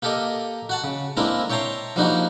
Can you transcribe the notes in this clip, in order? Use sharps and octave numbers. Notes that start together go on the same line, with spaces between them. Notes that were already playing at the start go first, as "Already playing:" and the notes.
A#3 G4 A4 A#4 D#5
F#4 F#5 A5
C#3
G#3 A#3 C4 D4 E4 A#4
C#5 E5 G5 A5 A#5 C6
F3 G3 A#3 D4 D#4 F#4